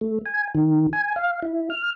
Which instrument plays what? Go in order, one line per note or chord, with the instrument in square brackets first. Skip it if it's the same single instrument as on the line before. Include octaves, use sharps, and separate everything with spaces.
[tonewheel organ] A3
G#5
D#3
G#5
F5
E4
F6